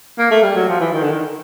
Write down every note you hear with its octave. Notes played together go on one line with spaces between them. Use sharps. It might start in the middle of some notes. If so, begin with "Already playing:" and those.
A#3
A3
G3
F#3
F3
E3
D#3
D3
D#3